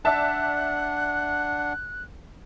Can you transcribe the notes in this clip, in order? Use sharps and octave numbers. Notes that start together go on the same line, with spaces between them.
D4 D5 E5 F#5 A5 F#6